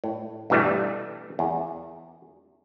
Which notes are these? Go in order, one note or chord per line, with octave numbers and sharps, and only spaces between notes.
A2
G2 B2 E3 G3 A3
E2